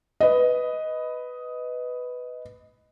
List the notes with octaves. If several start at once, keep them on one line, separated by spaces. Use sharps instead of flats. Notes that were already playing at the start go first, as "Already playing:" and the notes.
B4 D#5